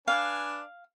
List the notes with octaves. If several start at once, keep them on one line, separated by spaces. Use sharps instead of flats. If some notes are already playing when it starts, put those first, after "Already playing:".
D4 B4 F5 G#5